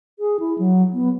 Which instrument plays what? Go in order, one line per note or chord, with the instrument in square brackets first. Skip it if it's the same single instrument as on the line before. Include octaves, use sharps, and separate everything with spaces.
[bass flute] G#4
E4
F#3
B3